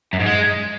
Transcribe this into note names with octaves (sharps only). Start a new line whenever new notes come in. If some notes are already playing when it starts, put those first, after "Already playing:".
F#2
G#2
G#3